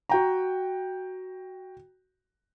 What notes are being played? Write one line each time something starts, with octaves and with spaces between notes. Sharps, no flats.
F#4 G5 A#5